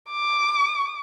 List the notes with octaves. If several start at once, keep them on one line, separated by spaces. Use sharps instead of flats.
D6